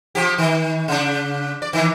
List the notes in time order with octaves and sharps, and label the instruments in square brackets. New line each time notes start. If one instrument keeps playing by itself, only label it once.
[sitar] F3 G4
D#3
C#3 D4
D5
D#3 E3